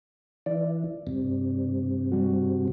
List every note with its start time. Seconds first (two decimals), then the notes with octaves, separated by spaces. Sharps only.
0.46 E3 D5
1.07 G2 C3
2.12 G3 F#4